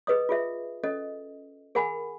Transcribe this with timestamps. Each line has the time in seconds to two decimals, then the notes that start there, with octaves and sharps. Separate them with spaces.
0.07 G#4 B4 D#5 D#6
0.29 F4 G#4 E5
0.84 C#4 A4 D#5
1.75 G#4 A#4 F#5 G#5 B5